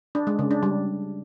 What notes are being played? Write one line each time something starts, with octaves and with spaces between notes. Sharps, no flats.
D4
G#3
C#3
D4
G3